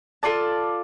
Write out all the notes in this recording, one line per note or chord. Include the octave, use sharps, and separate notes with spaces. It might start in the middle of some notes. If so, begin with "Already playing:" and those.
F4 A4 D5 A5